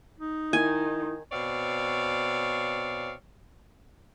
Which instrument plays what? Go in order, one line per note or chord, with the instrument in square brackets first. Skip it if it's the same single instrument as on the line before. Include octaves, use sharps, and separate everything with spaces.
[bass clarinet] D#4
[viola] D#3 [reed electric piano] E4 [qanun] G#5
[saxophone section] B2 C4 C#5 D5 F5